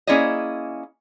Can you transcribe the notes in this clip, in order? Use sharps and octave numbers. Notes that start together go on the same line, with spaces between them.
A#3 C#4 E4 G#4 D5 D#5